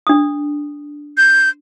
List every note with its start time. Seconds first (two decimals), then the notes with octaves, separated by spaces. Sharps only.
0.07 D4 D#6
1.17 G6